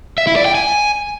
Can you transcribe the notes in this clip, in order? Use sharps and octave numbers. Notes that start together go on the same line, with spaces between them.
E5
E4
D5
G5
G#5